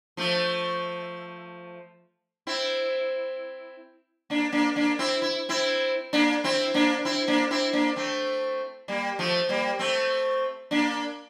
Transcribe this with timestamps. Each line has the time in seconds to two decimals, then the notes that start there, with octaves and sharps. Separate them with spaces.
0.17 F3 A3
2.47 C4 E4
4.30 A#3 D4
4.52 A#3 D4
4.76 A#3 D4
4.99 C4 E4
5.22 E4
5.49 C4 E4
6.13 A#3 D4
6.44 C4 E4
6.74 A#3 D4
7.05 C4 E4
7.28 A#3 D4
7.51 C4 E4
7.73 A#3 D4
7.96 A3 C4
8.88 G3 A#3
9.19 F3 A3
9.49 G3 A#3
9.79 A3 C4
10.71 A#3 D4